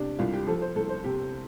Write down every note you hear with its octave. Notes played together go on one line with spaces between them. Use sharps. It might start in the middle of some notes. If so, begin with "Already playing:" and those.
Already playing: C3 D4 G4
C2 F4
G4
F3 A4
C5
C2 A4
C5
C3 G4